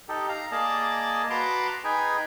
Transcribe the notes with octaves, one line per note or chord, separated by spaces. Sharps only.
D#4 G4 A4
F5 A#5
A#3 G#4 D5 D#5 A5
F#4 B4 A5 A#5 C6 D6
D#4 G#4 B4 G5 G#5